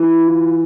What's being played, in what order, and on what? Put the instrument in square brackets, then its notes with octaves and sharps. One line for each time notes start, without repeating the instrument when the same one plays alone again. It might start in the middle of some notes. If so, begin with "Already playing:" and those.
Already playing: [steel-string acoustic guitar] E3 [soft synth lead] E4
[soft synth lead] F4